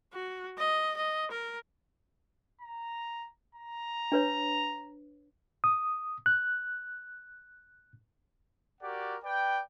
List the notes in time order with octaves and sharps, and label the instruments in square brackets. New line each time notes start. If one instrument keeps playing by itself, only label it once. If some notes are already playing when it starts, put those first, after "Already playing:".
[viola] F#4
D#5
D#5
A#4
[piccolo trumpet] A#5
A#5
[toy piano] D4 B4 C#5
[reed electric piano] D#6
F#6
[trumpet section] F#4 G4 A#4 D5 F#5
B4 D5 G5